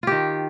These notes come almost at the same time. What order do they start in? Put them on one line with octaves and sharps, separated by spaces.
F4 G4 D#3